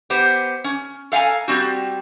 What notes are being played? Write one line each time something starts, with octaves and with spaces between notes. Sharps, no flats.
B3 G4 C5
C#4
A4 F5 F#5 G#5 A#5
G3 C4 F#4